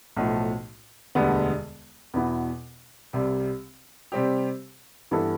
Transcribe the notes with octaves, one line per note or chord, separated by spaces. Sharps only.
B1 A2 F3 A3
E1 D2 D3 G3 B3
E2 B2 B3 E4
C2 C3 G3
C3 G3 C4 G4
G2 E3 B3 E4 A4